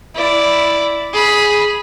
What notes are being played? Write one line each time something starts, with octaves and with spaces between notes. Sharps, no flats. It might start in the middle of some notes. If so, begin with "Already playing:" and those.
E4 D5
G#4 B5